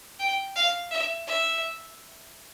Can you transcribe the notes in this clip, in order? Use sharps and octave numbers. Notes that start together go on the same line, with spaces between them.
G5
F5
E5
E5